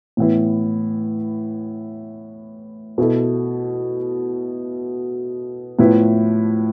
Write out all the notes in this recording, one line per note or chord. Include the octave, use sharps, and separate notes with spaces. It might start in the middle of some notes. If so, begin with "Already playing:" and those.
A2 E3 B3 E4
B2 B3 E4 A4
A2 F3 B3 E4 B4